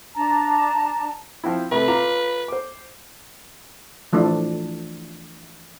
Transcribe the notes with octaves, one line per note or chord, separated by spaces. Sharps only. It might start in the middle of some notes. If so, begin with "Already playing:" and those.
D4 A5 A#5
F3 C4 E4
C3 A3 B4
F4 A#5 D6
C5 D6
E3 F3 A3 D4